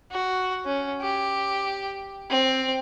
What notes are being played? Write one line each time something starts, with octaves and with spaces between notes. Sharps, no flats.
F#4
C#4
G4
C4